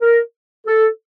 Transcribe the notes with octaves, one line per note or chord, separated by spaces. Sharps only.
A#4
A4